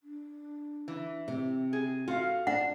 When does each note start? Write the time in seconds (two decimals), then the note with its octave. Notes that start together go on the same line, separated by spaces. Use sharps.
0.02 D4
0.88 E3
1.28 C3 C4
1.73 G#4
2.08 F4 F#4 A4 F5
2.47 D4 F#5